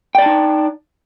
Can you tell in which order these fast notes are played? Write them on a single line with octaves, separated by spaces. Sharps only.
G5 D5 A5 D#4